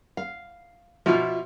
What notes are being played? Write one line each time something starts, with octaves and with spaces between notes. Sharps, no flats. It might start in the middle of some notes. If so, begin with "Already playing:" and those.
F5
B2 F3 F4 E5